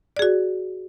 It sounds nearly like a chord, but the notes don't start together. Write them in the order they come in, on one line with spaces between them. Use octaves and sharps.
D5 G#4 F#4